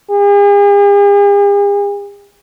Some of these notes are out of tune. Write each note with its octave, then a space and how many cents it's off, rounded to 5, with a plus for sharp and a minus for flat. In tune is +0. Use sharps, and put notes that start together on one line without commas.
G#4 -45